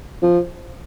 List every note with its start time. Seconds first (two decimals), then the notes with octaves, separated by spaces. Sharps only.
0.23 F3